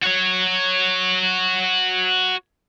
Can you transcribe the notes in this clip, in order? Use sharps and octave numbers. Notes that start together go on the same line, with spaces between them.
F#4 C#5